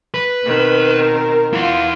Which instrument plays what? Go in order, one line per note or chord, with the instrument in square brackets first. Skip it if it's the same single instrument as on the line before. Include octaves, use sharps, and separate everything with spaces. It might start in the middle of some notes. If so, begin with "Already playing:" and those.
[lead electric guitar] B4
[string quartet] B2 D#3 C4
[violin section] A#4
[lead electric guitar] E4 F#5 [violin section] F4